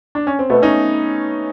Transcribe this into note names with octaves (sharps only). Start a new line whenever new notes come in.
D4
C#4
C4
B2 A3 B3
C#4 D#4